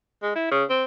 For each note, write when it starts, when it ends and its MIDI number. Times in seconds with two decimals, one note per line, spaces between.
0.23 0.32 56
0.35 0.48 64
0.51 0.63 49
0.70 0.85 60